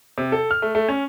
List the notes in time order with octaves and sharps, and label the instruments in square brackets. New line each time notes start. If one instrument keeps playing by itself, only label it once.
[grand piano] C3
A4
F6
A3
A3
C#4